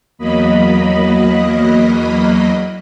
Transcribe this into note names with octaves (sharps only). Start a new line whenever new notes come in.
E2 F#3 A#3 D#5 B5